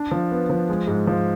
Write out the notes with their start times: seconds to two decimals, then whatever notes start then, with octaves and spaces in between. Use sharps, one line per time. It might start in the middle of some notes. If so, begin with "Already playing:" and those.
Already playing: D4
0.11 F3
0.31 B3
0.50 F3
0.69 G#3
0.87 G#2
1.07 F3